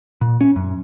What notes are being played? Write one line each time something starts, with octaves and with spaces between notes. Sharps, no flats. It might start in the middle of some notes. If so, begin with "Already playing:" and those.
A#2
C#4
F#2